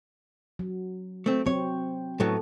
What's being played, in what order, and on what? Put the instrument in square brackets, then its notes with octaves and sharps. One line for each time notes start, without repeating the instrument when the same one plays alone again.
[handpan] F#3
[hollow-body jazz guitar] A3 C4
[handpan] F#3 C4 [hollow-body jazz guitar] C#5
[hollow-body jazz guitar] A2 F#3 B3 [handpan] A4